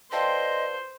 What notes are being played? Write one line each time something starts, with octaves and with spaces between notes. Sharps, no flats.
F4 A4 B4 C5 D5 D#5 G5